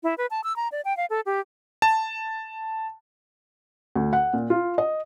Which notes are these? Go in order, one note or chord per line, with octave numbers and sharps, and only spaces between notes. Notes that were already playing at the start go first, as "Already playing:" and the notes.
E4
B4
A5
E6
A#5
D5
G5
F5
A4
G4
A5
D2
F#5
A#2
F4
D#5